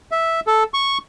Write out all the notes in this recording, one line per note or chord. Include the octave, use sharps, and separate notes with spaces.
E5
A4
C#6